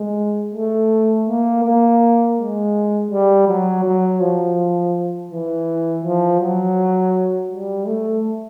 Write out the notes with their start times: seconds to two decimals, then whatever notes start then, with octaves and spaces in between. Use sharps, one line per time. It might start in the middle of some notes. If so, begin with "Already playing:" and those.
Already playing: G#3
0.54 A3
1.28 A#3
1.64 A#3
2.38 G#3
3.11 G3
3.48 F#3
3.84 F#3
4.20 F3
5.31 E3
6.03 F3
6.40 F#3
7.51 G3
7.86 A3